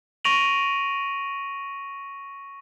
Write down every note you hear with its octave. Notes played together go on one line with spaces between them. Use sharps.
C#6 A#6 D7 D#7 F7 F#7